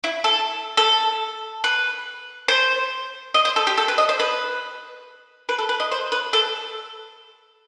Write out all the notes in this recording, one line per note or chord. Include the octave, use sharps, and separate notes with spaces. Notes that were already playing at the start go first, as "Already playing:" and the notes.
E4
A4
A4
B4
C5
D#5
C5
A4
G4
A4
B4
D#5
C5
B4
B4
A4
B4
D#5
C5
B4
A4